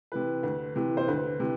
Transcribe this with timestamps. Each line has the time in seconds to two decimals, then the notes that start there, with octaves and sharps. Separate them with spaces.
0.12 C3 E3 B4
0.43 D2
0.76 C3 E3
0.97 C5
1.08 D2 B4
1.40 C3 E3